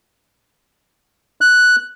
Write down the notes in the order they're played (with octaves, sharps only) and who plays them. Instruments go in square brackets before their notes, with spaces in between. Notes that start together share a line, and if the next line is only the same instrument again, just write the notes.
[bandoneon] F#6